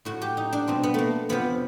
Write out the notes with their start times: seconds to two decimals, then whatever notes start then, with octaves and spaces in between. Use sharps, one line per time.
0.05 A2 F#3 F#4
0.22 G4
0.37 D#4
0.53 D4
0.68 B2 G3 C4
0.83 B3
0.94 A3 A#3
1.29 F2 C3 F3 B3